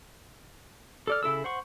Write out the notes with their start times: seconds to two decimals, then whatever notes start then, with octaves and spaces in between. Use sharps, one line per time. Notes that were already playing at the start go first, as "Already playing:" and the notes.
1.07 A4 D5 F6
1.23 C#3 E4 A4 E6
1.44 C5 F#5 C#6